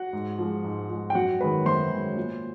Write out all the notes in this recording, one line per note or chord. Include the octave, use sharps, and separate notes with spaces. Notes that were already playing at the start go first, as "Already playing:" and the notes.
Already playing: F#4 F#5
G#2
F3 G#3
G#2
F3 G#3
G5
F#2 F#4 F#5
D#3 G#3 B4 B5
F#2 C5 C6
D#3 G#3
A#2